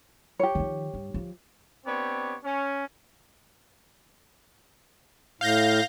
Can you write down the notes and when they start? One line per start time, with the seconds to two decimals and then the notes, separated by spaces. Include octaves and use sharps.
0.39 G4 C#5
0.55 D#3 F3
0.94 G2
1.14 F3
1.85 B3 C4 D4 G4 C#5
2.44 C#4
5.41 A2 F5 G6 A#6